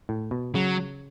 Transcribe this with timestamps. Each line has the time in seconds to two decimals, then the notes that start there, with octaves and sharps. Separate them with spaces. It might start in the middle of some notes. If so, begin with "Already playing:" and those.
0.09 A2
0.31 B2
0.55 C#3 F#3